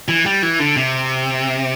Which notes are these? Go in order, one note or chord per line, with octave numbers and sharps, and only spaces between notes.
E3
G3
E3
D3
C3